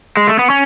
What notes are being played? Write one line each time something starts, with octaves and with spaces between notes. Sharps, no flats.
G#3
A3
B3
C#4